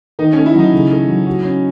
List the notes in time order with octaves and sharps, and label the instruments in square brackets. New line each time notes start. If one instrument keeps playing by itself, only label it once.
[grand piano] D#3 [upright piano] D#4
[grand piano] A3 [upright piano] C#4
[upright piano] E4
[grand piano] F#3 [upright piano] D#4
[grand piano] C#3
A3
F#3
F#4
C#4